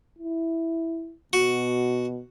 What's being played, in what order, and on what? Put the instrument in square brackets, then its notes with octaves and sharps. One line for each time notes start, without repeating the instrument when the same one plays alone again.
[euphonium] E4
[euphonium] B2 [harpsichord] F#4